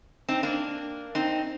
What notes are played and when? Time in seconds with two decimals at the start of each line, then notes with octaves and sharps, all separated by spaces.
0.29 C4 D#4
0.43 A#3 D4
1.15 C4 D#4